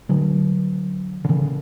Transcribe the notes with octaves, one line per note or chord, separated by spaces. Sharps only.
D3 F#3
D3
C#3 E3